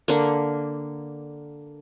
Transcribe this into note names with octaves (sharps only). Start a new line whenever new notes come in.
D3 A#3